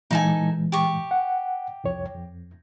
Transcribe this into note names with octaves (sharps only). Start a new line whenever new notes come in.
A#2 E3 G#3 D#4 A4 G#5
G4 C#6
F#5
C2 F2 C#5
F2